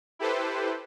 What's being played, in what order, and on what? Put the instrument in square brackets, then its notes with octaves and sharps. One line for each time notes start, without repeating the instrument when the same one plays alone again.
[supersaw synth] E4 G4 A4 B4 C5